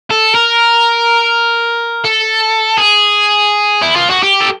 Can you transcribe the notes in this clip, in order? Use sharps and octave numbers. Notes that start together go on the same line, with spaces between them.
A4
A#4
A4
G#4
E4
F4
F#4
G4
A4